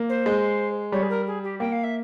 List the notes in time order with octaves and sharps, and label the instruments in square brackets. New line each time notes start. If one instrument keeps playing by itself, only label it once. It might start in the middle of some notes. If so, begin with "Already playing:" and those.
Already playing: [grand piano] A#3
[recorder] C5
[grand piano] G#3
[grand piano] G3 [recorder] C#5
[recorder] G#4
A#4
G#4
G4
[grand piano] A#3 [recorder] G5
[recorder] F5
E5